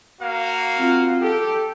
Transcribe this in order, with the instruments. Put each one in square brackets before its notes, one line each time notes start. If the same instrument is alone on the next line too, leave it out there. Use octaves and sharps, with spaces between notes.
[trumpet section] A#3 F#4 F5
[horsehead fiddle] C4 F4
[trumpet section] G4 [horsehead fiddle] A4